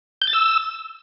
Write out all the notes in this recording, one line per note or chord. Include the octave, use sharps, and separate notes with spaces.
G6
A6
E6